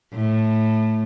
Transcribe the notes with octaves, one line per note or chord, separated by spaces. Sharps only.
A2